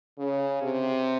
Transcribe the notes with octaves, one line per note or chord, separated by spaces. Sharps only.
C#3
C3